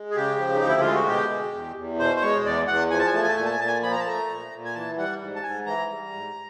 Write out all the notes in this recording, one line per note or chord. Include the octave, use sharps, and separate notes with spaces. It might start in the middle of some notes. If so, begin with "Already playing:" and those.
Already playing: G#3
G#4
C#3 G4
F3
D#4
D2
E4
G#3 F4
F#4
B2 G4
G#3
E2
E2
B2 C5
C5
G#3 C#5
E2 D5
E2 F#5
F3 G#5
A5
G#5
A3 A5
G#5
A5
A#2 G#5
A5
G#5
A#2 A5
G#5
F3 B5
A#5
A5
A3 A#5
A#2
A#2
G#5
E3 A5
G3 F#5
G#2
A5
G#2 G#5
E3 A#5
G3
G#2